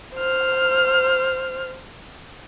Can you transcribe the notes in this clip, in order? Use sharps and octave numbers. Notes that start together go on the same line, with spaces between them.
C5 F6